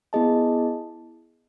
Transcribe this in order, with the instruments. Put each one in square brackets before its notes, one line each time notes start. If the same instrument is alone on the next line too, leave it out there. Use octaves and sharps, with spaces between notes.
[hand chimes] B3 E4 G#4 D#5 A5